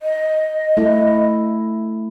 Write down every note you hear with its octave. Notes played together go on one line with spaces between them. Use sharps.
D#5
A3 E4